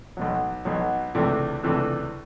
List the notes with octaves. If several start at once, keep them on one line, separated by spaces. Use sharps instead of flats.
B1 B2 F#3
B1 B2 F#3
C#2 C3 E3 A3 D4
C#2 C3 E3 A3 D4